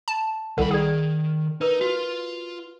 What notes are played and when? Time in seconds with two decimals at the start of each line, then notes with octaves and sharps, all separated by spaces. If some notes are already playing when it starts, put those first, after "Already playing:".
0.08 A5
0.58 C2 D#3 A4 F#5 B5
0.71 D#3 G#4 D5 G5
1.61 D#4 A#4 B4
1.81 F4 F#4